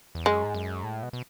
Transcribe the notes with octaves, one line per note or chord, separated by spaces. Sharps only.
E2
F#2 G#3
G#2
F#2
A2
B2
B2